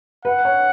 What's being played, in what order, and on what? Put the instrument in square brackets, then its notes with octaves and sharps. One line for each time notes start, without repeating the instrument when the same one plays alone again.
[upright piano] B4 [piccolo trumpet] F#5
[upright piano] C#5